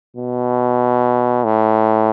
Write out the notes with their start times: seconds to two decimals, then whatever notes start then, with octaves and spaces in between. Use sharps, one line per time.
0.16 B2
1.44 A2